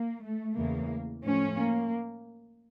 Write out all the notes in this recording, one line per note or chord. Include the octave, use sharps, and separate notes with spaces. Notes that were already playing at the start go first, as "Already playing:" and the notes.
Already playing: A#3
A3
E2 C#3 E3 A3 A#3
A2 F3 A3 C#4
A#3